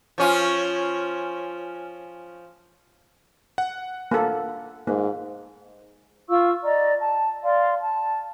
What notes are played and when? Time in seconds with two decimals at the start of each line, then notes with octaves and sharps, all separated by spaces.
0.18 F3 C#4 F4
3.58 F#5
4.11 A#3 A4
4.87 G#2 A#3
6.29 F4 F5 C#6 E6
6.65 D5 D#5 A#5
7.00 A5
7.43 D5 F5 C6
7.80 A5